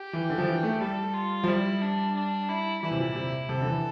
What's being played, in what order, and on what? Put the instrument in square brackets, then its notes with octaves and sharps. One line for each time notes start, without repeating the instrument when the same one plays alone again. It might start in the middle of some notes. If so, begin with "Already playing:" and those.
Already playing: [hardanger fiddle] G4
[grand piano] E3
D3
F3
E3
A3
[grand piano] G3 [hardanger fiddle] A4
[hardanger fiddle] F4
[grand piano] F3
[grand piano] G3 [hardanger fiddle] E4
[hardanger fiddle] D4
D4
E4
[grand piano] E3 [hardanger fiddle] E4
[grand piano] C3
A#2
C3
[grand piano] C3 [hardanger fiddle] A4
[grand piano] D3
E3